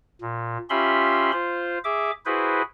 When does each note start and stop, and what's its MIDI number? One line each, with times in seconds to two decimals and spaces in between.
0.22 0.58 46
0.70 1.31 61
0.70 1.31 65
0.70 1.31 67
0.70 1.31 76
0.70 1.31 83
0.70 1.31 84
1.32 1.78 65
1.32 1.78 72
1.84 2.11 68
1.84 2.11 76
1.84 2.11 86
2.26 2.62 64
2.26 2.62 66
2.26 2.62 68
2.26 2.62 71
2.26 2.62 72